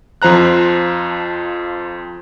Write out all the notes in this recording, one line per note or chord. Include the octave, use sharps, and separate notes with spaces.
F2 F3 C5 A#5 F#6